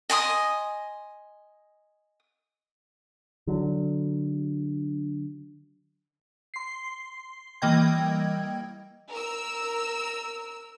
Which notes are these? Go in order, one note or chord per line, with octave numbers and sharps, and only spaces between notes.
D#5 G#5 C6 D#6
D3 F#3
C6 C7
E3 G3 A#3 D#5 G5 G#6
A#4 E6